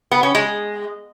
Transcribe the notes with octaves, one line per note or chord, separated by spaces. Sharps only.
B3
C#4
G#3